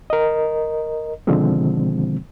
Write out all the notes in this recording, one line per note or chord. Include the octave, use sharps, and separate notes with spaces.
A#4 D#5
B2 D3 D#3 F3 G#3 C4